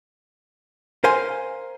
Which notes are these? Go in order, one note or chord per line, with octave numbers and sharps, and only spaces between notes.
A#4 C5 F5 G#5 C6